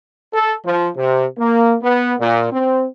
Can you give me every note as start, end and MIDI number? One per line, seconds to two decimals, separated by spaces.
0.32 0.54 69
0.64 0.88 53
0.96 1.24 48
1.37 1.74 58
1.82 2.13 59
2.18 2.47 46
2.50 2.84 60